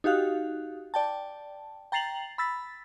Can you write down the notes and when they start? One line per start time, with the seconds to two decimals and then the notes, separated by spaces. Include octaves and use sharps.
0.04 D#4 F#4 G4 F5 F#6
0.94 D5 G5 A5
1.92 G5 A#5 A6 C7 F7 F#7
2.38 B5 E6 A6 B6